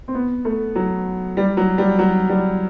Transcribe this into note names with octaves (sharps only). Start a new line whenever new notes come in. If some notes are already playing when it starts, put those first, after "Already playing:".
C4
B3
A3
F#3
G3
F#3
G3
F#3
G3